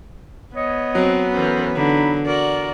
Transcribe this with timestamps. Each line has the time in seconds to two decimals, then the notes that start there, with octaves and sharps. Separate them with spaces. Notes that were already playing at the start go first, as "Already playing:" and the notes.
0.55 B3 C#5 D#5
0.95 F#3 C4
1.33 E3 C#4 A4 A#4 C5
1.75 D3 D#4 B5
2.26 F#4 A#4 D5